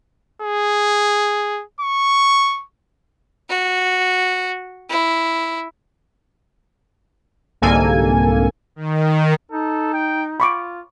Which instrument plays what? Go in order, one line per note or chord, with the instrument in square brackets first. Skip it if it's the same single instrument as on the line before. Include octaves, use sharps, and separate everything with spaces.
[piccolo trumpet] G#4
C#6
[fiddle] F#4
E4
[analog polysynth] C2 G#2 D3 A#3 A4 G#5
[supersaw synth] D#3
[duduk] D#4 [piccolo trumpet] A4
[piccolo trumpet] G5
[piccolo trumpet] F4 [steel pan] B5 C#6 D6